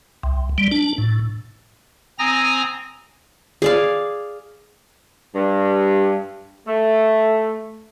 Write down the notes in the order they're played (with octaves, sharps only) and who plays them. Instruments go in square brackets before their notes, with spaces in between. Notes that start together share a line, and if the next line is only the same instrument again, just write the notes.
[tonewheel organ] C2
G3
D4
A2
[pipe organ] C4 G#5 A#5 D#6 A#6
[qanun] G#4 D5 F5
[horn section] G2
A3